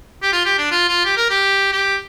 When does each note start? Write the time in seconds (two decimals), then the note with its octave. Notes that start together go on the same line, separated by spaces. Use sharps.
0.23 G4
0.33 F4
0.46 G4
0.58 D4
0.71 F4
0.89 F4
1.05 G4
1.17 A#4
1.30 G4
1.73 G4